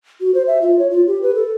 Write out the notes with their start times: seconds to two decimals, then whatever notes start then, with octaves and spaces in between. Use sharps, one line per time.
0.21 F#4
0.34 C5
0.47 E5
0.62 F4
0.79 C#5
0.91 F4
1.07 G4
1.22 B4
1.35 A4